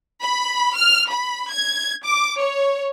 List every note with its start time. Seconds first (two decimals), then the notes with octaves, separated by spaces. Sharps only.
0.21 B5
0.77 F6
1.11 B5
1.52 G#6
2.05 D6
2.38 C#5